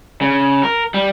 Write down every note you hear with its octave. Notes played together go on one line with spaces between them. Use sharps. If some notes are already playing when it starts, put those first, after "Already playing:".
C#3
A#4
G3